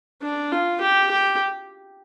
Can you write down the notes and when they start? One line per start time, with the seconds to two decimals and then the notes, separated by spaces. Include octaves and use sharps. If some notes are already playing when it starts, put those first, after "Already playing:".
0.22 D4
0.52 F4
0.81 G4
1.11 G4